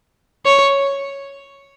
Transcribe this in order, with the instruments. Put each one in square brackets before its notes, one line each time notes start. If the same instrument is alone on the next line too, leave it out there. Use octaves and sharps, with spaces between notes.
[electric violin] C#5